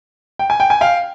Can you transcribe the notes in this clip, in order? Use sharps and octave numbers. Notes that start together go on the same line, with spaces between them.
G5
G#5
G5
G#5
F5 G5